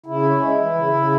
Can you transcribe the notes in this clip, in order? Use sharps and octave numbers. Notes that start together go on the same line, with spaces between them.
C#3 E4
C#4
G#3
E3
C#3
C#3